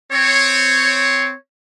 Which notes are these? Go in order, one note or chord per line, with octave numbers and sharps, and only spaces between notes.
C4 C#5